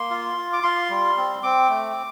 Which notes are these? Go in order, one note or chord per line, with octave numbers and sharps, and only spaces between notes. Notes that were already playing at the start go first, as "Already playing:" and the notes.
Already playing: A#3 C6
F4
F4
D6
F4 C6
G3
C4
C4 D6
A3